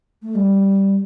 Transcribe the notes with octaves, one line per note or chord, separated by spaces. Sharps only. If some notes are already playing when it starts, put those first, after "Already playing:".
A3
G3